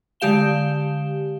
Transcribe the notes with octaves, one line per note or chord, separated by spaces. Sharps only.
D3 G#3 G4 F5 E7 G7